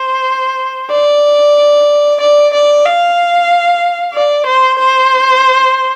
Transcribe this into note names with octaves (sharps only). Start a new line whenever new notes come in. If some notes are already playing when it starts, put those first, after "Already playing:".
Already playing: C5
D5
D5
D5
F5
D5
C5
C5